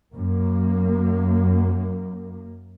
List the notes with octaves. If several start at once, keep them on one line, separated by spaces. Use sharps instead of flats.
F#2 A#3